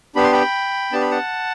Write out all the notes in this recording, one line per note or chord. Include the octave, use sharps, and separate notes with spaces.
B3 D4 G4 B5
C6
G5 B5
B3 D4 G4 A5
B5
F#5 A5